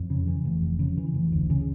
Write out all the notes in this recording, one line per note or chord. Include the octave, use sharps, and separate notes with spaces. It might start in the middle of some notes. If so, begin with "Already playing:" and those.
Already playing: F2
C#3
E3
F1
F2
C#3
E3
F1
D2
C#3